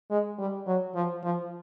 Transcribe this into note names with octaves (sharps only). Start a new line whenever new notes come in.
G#3
G3
F#3
F3
F3